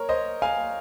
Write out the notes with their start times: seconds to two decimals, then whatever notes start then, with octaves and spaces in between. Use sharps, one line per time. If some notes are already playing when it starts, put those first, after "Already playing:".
Already playing: A#4 C#5
0.09 C5 D#5
0.42 F5 G#5